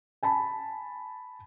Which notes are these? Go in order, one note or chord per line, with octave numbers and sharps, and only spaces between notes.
G#5 A5 B5